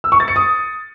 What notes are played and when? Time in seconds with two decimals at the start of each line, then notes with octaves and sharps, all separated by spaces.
0.04 E6
0.12 C#6
0.20 A6
0.28 C#7
0.36 D#6